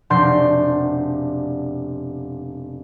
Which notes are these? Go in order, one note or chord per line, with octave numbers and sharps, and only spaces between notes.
F1 B2 D4 C6 G6